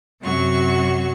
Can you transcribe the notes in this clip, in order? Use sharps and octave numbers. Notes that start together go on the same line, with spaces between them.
F#2 C3 F#3 F#4 C#6